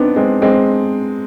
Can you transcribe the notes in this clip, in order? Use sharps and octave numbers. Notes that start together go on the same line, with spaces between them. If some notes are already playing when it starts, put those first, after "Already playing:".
Already playing: B3 C4 D4 D#4
G#3 C4
G#3 C4